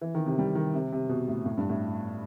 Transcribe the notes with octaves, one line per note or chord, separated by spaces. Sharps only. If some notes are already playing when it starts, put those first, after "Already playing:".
E3
D#3
C3
G3
D#3
C3
C3
B2
A2
A2
G2
A2